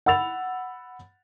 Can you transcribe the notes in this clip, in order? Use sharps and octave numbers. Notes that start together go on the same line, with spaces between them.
F#5 B5 E6 A6 F7